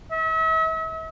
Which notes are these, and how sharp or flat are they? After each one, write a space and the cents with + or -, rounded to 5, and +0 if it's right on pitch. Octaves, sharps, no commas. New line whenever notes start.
E5 -40